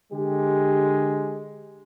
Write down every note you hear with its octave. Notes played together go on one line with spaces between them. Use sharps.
D3 G#3 G4